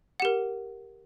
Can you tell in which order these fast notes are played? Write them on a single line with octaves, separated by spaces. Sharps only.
F#5 G4 A#4